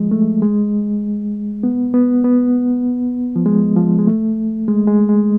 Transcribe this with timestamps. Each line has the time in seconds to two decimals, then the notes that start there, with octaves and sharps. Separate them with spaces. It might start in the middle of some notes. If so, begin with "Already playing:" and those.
Already playing: F3 G#3
0.11 A3
0.42 G#3
1.63 B3
1.94 B3
2.24 B3
3.36 F3
3.46 G#3
3.76 F3
3.99 G#3
4.07 A3
4.68 G#3
4.87 G#3
5.09 G#3